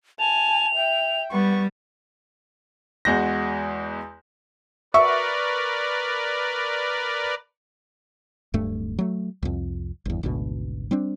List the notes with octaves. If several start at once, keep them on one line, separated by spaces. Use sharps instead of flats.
G#5 A5 F7
E5 G5
G3 B3 C#6
E2 G#3 F#4 G6 A#6
F#4 A#4 B4 D5 E5 C#6
D1 G2 A3
F#3 A3
C2 F2
G1 E2
G#1 D2 B2
G3 C4 D4